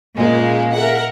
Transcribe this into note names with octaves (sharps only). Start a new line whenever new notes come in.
A#2 C#3 G#3 A#3
A#4 E5 F#5